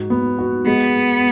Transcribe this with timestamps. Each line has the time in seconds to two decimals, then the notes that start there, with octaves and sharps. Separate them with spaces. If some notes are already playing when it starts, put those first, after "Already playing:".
Already playing: G#2 F#4
0.10 B3
0.39 F#4
0.66 G#3 B3